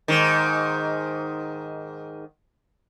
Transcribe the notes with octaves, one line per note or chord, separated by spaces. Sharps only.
G#2 D#3